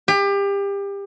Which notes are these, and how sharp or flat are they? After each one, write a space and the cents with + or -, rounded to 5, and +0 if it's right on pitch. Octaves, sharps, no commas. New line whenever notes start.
G4 +30